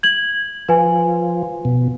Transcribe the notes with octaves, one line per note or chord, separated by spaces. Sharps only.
G#6 F#7
F3 B4 G#5
B2